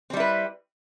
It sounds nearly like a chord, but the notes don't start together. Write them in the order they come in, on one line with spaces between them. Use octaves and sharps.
C4 G3 E4 B4